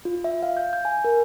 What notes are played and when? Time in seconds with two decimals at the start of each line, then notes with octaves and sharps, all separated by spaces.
0.05 F4
0.24 E5
0.43 F5
0.57 G6
0.73 G6
0.85 G#5
1.05 A#4